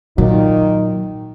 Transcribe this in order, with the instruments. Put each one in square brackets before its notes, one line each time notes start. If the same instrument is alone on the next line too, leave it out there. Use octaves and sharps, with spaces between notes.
[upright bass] A#2 [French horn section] D#3 D#4 [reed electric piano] F#3